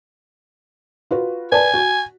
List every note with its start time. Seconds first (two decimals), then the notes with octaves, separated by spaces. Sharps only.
1.11 F4 F#4 B4
1.52 B4 D5 G#5 A5
1.74 F#4